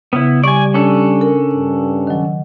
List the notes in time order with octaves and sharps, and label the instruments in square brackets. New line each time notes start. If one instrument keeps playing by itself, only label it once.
[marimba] C#3 [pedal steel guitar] B3 E4
[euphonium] G3 [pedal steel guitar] D5 G#5 [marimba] C#6
[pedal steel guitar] C#4 D4 A4
[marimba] A#4
[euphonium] G2
[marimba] D#3 F#3